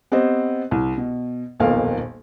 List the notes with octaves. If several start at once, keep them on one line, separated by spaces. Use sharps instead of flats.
B3 C4 G4 C5 D#5
C2
B2
D#1 B1 F2 A#3 F5